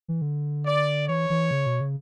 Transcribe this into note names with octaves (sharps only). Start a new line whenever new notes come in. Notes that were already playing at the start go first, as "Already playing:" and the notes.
E3
D3
D5
E3 C#5
E3
C#3
B2
C#3